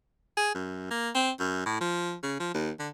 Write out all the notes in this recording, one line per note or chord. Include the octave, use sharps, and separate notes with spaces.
G#4
F#2
A#3
C4
F#2
A2
F3
C#3
F3
D#2
D3